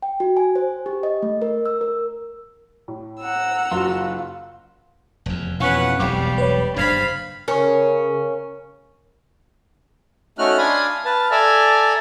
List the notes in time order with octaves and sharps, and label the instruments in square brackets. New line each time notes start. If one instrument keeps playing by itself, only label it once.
[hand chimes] G5
F#4
G#5
C5
G4
D#5
A3
A#4
E6
A#4
[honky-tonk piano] A2
[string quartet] F#5 A#5 E6
[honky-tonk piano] F#1 F#4 [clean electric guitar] F4
[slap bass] F1 E2
[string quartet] F2 C#4 [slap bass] B2 E3 [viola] B4 F#5 [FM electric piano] F5 C#6
[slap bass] E1 B1 E2 [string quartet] G3 [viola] G4 [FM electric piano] F5 C#6 D6
[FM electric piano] B4 C#5
[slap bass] F#1 G2 [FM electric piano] D4 G#6 C7 [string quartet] C5 [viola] F5 B5
[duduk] C#3 [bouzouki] C#4 [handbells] A#4 C#6
[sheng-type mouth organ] A3 C#4 D#4 F#4 F6 F#6
D4 F5 G#5 B5 C6 D#6
B4 F5 A5
A4 D5 E5 G#5 A#5